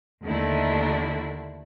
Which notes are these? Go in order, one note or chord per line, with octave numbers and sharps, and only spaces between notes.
D#2 D3 D#3 A3 D4 E4